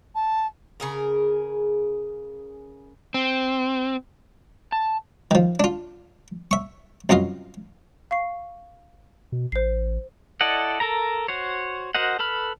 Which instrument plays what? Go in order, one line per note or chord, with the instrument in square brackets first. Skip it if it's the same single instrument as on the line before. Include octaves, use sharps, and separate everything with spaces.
[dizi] A5
[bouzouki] C#3 G#4 A#4
[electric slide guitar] C4
A5
[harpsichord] D#3 F3
D4 F4
E5 C#6
C2 F#2 F4 D#5 F5
[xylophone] F5 C#6 C7
[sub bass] B2
[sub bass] A1 [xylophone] C5 C7
[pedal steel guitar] E4 A4 D5 D#5 F#5
A4 A#4 A#5
F#4 C5 C#5
F#4 A#4 C5 D#5 F#5
A4 B4 B5 F6